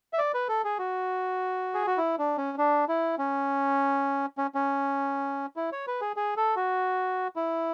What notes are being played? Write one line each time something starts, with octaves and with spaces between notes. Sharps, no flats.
E5
D5
B4
A4
G#4
F#4
G#4
F#4
E4
D4
C#4
D4
E4
C#4
C#4
C#4
E4
C#5
B4
G#4
G#4
A4
F#4
E4